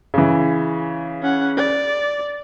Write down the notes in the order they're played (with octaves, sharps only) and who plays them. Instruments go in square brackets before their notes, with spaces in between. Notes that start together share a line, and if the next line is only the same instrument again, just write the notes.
[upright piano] C#3 E3
[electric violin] C#4 F#5
D5